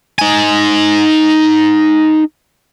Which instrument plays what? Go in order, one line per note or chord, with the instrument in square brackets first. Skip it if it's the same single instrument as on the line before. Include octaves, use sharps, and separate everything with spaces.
[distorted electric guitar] D#4 G#5